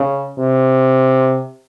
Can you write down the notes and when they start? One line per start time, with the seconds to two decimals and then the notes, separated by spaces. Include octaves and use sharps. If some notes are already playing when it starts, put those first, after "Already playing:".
Already playing: C#3
0.38 C3